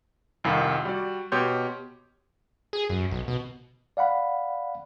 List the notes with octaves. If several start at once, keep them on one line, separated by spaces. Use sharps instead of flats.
C2 F2 D#3 F5
G3 F#4 D5
B2 G4 C#5 C6 G6
G#4
F#2
B1
B2
D5 F5 F#5 B5